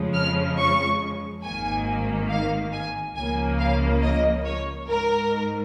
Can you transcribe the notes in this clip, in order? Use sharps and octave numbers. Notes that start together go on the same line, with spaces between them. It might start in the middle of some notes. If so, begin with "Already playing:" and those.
Already playing: F2 C#3 F3 G#3
F6
C#6
G#1 G#2 D#3 A#3 G#5
F5
G#5
C#2 C#3 F3 A#3 G#5
F5
D#5
C#5
G#2 A#4